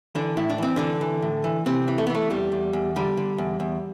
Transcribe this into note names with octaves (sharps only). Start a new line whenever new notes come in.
D3 E3 D4
A2 E4
D4
E3 C4
D3 E3 D4
E3
A2
E3
C3 E3 C4
E3
A3
B3
E3 A3
E2 G3
E2
E2
D3 G3
D3
E2
E2